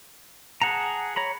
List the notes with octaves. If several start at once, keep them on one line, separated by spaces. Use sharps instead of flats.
G#4 F#5 A5 A#5
C#5 A#5 B5